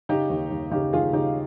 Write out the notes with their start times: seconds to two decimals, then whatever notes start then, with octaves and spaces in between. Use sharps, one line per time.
0.09 C#3 D#4 G4
0.30 D#2
0.50 D#2
0.71 C#3 D#4 G4
0.93 D#2 F4 G#4
1.13 C#3 D#4 G4